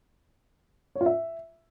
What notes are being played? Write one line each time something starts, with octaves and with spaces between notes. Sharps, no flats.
C#5
F4
E5